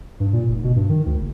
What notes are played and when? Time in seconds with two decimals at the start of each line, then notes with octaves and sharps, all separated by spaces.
0.20 G2
0.33 A#2
0.49 F1
0.64 B2
0.76 G2
0.89 D#3
1.06 D2
1.19 F#1